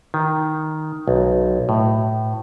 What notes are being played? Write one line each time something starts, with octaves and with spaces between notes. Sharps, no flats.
D#3
B1
A2